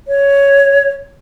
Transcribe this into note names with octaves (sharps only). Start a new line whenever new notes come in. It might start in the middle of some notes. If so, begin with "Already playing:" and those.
C#5